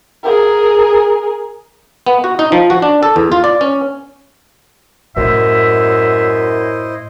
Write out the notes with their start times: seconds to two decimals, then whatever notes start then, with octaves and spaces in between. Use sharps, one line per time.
0.23 G#4 A#4
2.07 B3
2.24 F#4
2.39 D#4
2.52 F3
2.70 F#4
2.82 D4
3.03 A4
3.16 E2
3.32 F4
3.44 D5
3.61 C#4
5.16 F#2 A2 E4 C5 D#5 E5